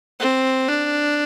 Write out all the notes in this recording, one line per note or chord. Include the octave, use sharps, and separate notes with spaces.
C4
D4